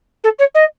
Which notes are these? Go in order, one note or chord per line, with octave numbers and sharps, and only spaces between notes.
A4
C#5
D#5